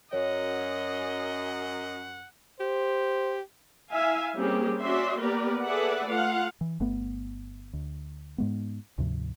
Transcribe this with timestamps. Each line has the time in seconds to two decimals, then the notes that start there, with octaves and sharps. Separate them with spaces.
0.13 F#2 C#5 D#5 F#5
2.60 G4 C5
3.91 E4 E5 F5 G#5
4.35 G3 A#3 C4 C#4 G4 G#4
4.78 C#4 F#4 D5 E5 C6
5.18 A#3 B3 G4 A#4 B4 D5
5.63 G#4 A4 B4 D5 E5 F#5
6.07 A3 F4 F5 F#5
6.61 E3
6.80 G1 A3 B3
7.73 D2
8.38 G#2 G#3 B3
8.98 D2 G#2 C3 F3